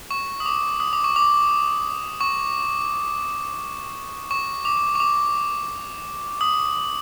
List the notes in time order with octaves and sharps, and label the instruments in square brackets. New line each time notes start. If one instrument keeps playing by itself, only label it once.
[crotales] C#6
D#6
D6
D#6
D6
C#6
D6
C#6
C#6
D6
C#6
D6
D#6